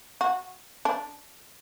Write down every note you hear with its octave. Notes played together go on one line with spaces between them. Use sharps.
F#4
D4